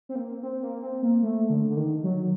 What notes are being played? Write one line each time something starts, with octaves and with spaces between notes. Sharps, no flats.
C4
A#3
C4
A#3
C4
A#3
A3
D3
D3
D#3
F#3